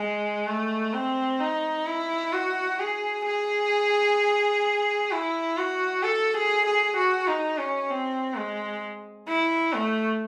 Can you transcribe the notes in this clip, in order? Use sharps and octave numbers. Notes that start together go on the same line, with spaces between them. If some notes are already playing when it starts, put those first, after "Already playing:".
Already playing: G#3
A3
C4
D#4
E4
F#4
G#4
G#4
E4
F#4
A4
G#4
G#4
F#4
D#4
C#4
C4
G#3
E4
A3